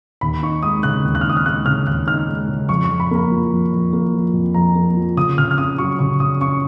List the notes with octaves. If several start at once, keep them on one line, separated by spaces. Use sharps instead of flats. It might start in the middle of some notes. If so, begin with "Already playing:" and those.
D#2 B5
D#4 C#6
G#3 D#6
C#3 F#6
D#2
F#6
F6
D#4
D#6
F6
G#3 F#6
C#3 F6
D#2 F#6
D#4 F6
G#3
C#3
F2 C#6
C#6
F2
B5
A#3 B5
F3
F2
F2
A#3
F3
F2
F2 A#5
A#3
F3
C#3 D#6
C#3 F6
F6
C#4 D#6
F#3 C#6
C#3 C#6
C#3 D#6
C#4 C#6